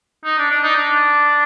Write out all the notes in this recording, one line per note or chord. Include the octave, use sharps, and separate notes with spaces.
D#4
D4
D4
D#4
D4